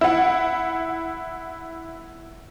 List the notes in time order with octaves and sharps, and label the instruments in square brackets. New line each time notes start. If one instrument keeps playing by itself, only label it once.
[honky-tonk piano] E4 F#5